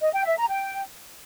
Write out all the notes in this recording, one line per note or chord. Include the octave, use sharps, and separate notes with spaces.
D#5
G5
E5
A#5
G5